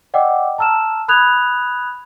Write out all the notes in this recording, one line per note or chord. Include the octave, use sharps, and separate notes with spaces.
D5 D#5 F#5 G5 D6 E6
A5 A#5 E6 F6 E7
B5 D#6 F#6 G#6 F7